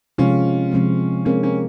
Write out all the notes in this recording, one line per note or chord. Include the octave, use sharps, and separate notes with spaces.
C3 F3 G#3 C4 C#4 F4
C3 F3 G#3 C4
G#3 A#3 C4 C#4 D#4 G#4
A#3 C#4